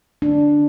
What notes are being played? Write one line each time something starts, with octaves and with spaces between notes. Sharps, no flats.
D4